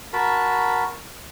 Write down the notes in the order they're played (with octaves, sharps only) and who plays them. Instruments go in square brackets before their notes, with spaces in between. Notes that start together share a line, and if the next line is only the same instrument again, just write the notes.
[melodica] F#4 A#4 A5 B5